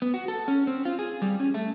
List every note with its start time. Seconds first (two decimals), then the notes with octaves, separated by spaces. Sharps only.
0.02 B3
0.14 F#4
0.28 A4
0.48 C#4
0.67 C4
0.85 F4
0.99 G#4
1.22 G3
1.40 C#4
1.54 A3